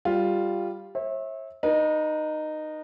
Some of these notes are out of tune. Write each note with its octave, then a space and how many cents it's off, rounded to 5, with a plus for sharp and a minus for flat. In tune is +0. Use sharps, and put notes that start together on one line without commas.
G3 +0 F4 +0 F5 +0
C#5 -45 E5 -20
D#4 -15 B4 -45